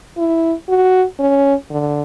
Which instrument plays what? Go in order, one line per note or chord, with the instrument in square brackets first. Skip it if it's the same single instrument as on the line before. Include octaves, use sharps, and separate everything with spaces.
[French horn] E4
F#4
C#4
D3